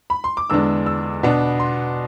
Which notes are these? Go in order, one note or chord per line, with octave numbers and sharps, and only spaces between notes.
B5
C6
D6
E2 D3 G#3 D4 E6
E6
B2 B3 D4
C6